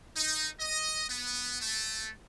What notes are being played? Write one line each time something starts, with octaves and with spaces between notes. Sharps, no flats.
D#4
D#5
B3
A3